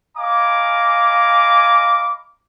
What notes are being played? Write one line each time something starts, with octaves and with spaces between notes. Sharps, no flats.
D#5 F5 G#5 A#5 B5 D6